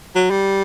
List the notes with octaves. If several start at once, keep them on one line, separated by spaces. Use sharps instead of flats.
F#3
G3